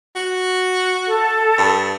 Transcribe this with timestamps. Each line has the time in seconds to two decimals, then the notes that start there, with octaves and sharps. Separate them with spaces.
0.16 F#4
1.07 A4
1.58 G2